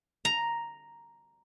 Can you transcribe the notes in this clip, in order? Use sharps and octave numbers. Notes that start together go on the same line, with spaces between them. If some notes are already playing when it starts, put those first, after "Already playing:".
A#5